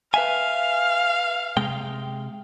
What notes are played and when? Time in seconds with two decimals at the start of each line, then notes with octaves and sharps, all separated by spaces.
0.14 B4 E5 F5 G#5
1.57 C3 G#3 G5